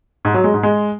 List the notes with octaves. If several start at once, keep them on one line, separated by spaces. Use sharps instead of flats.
G#2
F#3
G#3
G#2
G#3